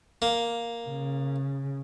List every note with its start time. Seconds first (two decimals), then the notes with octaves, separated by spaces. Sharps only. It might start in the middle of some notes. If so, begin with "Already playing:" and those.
0.22 A#3
0.87 C#3